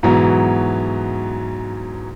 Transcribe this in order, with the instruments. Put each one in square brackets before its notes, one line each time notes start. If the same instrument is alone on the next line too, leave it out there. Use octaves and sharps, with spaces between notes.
[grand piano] G#2 B2 E3 F#3